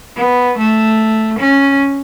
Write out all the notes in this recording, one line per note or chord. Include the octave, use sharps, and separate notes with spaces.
B3
A3
C#4